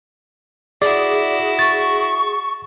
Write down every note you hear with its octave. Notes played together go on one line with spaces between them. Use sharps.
E4 F#4 G#4 D5
C#6 A6